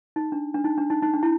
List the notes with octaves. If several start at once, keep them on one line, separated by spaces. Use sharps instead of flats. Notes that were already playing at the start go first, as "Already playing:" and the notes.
D#4
D4
D4
D#4
D4
D#4
D#4
D4
E4